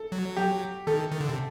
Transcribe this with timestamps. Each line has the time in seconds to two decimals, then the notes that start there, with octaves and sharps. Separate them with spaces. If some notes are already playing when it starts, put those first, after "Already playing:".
Already playing: A4
0.12 F#3
0.36 G4
0.87 D#3 A4
1.11 D#3
1.21 D3
1.29 C3